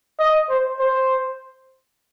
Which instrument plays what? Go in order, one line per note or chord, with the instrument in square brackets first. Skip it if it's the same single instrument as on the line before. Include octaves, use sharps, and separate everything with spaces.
[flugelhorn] D#5
C5
C5